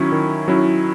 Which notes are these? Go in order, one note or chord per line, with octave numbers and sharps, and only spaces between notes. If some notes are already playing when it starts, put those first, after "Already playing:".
Already playing: D#3 F#3 C#4 E4 C#6
D#3
F#3 C#4 E4